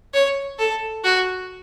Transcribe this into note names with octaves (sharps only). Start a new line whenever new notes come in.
C#5
A4
F#4